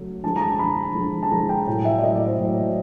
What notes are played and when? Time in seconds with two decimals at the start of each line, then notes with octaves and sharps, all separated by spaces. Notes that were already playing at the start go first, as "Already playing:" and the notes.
Already playing: C#3 F#3 A3
0.23 D3 F3 G#3 A5
0.36 A#5
0.41 A5
0.59 D3 F3 G#3 B5
0.95 D3 F3 G#3
1.23 A5
1.31 D3 F3 G#3 A#5
1.49 G5
1.67 A2 F#3 A3 G5
1.85 E5
1.98 D5
2.03 A2 F#3 A3 D#5
2.15 D5
2.26 C5
2.39 A2 F#3 A3